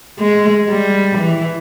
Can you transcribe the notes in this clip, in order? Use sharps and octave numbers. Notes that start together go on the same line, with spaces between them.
G#3
G3
E3